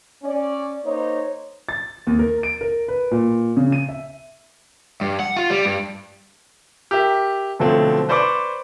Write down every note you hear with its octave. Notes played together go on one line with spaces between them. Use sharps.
C#4 D5
A#3 D#4 C5 C#5
A6
D#2
A#4
D7
A#4
B4
A#2
C#3
D#7
E5
G2
F#5
F4
G3
G2
G4 A#4 E5
B2 D3 F3 F#3 A3 C4
B4 C5 D5 B5 C#6 D6